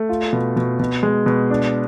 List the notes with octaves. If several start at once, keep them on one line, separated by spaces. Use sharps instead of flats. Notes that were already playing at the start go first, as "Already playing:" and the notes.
Already playing: A3
F4
B2
B2
B2
G#3
B2
D4